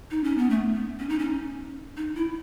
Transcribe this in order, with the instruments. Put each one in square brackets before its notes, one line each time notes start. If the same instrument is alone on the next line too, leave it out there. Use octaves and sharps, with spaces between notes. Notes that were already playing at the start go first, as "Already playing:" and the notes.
[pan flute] D#4
C#4
B3
A3
B3
C#4
D#4
C#4
D#4
E4